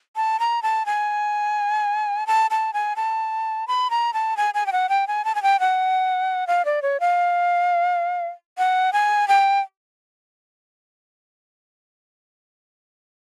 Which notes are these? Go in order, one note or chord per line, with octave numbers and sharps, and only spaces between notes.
A5
A#5
A5
G#5
A5
A5
G#5
A5
B5
A#5
A5
G#5
G#5
G5
F#5
G5
G#5
A5
G#5
G5
F#5
F5
D5
C#5
F5
F#5
G#5
G5